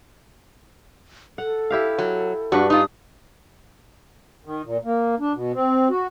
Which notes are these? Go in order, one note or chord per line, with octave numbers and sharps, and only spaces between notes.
A4 F#5
E4 G4 F5
F#3
G2 D4 F#4 B4
D#4 F4 D#6
D#3
A#2
A#3
D4
B2
C4
F#4